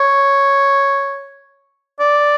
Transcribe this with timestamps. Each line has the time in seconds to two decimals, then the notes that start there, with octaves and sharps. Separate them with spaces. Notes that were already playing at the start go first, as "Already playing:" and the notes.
Already playing: C#5
2.00 D5